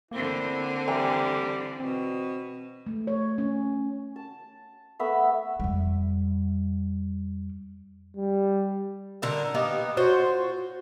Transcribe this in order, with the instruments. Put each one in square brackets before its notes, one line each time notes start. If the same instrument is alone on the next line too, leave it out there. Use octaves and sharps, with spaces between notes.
[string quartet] D3 C4 [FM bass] A#3 [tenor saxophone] E4
[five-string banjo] E3 G5 A#5 [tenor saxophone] G3
[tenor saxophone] B2 [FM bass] C4
[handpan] A3
C#5
C#4
[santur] A5
A3 B3 E5 B5
[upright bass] F2 G3
[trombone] G3
[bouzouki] A#2 D3 A#4
A#3 B3 D#4 G4
F4 F#4 C5 C#5